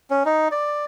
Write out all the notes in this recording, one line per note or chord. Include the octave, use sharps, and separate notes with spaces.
C#4
D#4
D5